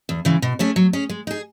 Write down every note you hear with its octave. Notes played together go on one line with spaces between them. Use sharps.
E2
C#3 E3 G#3
B2
A3 C#4 G#4 C#5
F#3
C#4 G#4
G#3
D#4 G#4